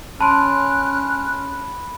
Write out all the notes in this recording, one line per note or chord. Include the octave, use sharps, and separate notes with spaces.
C#4 A5 B5 C6 F6 F#6 D7